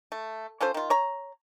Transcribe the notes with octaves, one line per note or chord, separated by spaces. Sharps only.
A3
C#4 F4 A4 C5
D#3 F4
C#5 A#5